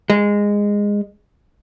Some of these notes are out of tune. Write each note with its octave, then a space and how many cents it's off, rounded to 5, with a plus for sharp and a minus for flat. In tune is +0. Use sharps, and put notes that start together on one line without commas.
G#3 -15